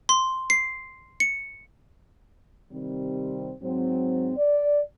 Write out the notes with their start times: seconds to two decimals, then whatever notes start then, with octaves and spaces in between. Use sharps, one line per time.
0.09 C6
0.50 C7
1.20 C#7
2.72 C3 D#3 G3 C4
3.62 G#2 F#3 C4
4.37 D5